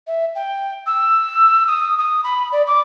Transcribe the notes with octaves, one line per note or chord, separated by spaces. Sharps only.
E5
G5
E6
D#6
D#6
B5
D5
D6